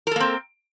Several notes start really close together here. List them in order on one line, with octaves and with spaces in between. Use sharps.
A#4 A4 A#3 C4